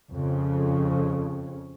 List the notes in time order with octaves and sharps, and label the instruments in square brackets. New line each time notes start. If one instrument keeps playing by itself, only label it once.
[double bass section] F2 C#3